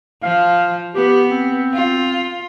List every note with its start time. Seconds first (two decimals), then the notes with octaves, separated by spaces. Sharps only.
0.23 F3 F5
0.95 B3 G4
1.31 C4
1.74 F4